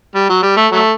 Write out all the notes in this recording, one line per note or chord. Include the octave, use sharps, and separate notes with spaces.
G3
F#3
G3
A3
F#3 A3